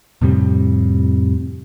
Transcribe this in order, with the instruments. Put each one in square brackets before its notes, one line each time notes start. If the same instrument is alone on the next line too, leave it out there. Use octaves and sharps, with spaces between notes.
[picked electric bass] F2 A2 C3 G3